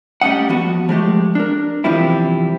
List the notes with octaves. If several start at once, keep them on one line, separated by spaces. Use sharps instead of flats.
G3 A3 C#4 D#5 F#5
F3 B3 F#4
F3 G#3 A3 G4
D4 A#4
E2 C3 F3 G3 C4 E4